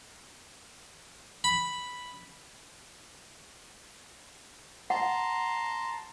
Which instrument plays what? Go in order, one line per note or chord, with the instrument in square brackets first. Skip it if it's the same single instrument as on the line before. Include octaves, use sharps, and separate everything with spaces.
[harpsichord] B5
[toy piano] F#5 [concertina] A5 A#5 C6